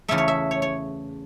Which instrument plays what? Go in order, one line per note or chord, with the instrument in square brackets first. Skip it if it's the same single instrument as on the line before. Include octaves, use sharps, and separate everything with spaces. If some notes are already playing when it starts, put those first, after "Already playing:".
[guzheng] E2 C#3 A3 E5
C#5
E5
C#5
C#5